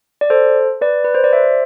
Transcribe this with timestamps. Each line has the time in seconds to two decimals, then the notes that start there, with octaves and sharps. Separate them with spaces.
0.21 D5
0.30 A4 C5
0.81 B4 D5
1.04 B4
1.14 C5
1.24 D5
1.33 C5 E5